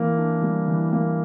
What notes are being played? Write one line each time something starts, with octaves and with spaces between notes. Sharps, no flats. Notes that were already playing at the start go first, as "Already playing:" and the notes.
Already playing: E3 A#3
D4
G3
E3
A#3